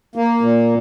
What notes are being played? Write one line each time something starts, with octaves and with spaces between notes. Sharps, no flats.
A#3
A#2